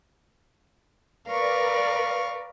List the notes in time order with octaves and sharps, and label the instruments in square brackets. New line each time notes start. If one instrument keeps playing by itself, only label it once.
[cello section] A#4 B4 D5 [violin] F5 C#6